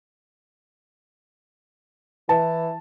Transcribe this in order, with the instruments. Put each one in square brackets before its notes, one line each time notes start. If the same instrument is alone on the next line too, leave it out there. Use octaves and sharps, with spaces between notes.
[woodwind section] E3 [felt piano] A5